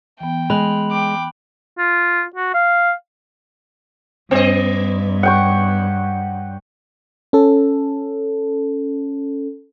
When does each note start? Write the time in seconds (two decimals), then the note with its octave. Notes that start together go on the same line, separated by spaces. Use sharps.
0.21 E3 B3 G5
0.50 G#3 B5 F#6 F#7
0.91 G5 D6
1.78 F4
2.36 F#4
2.54 F5
4.31 G2 B3 D#5
5.23 F#5 G5 C#6
7.33 C#4 A4